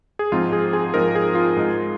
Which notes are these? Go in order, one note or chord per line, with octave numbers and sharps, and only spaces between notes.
G#4
G#2 F3 C4 D#4 F4
G#4
G#4
G#2 F3 C4 D#4 A#4
G#4
F4
G#2 G#3 D#4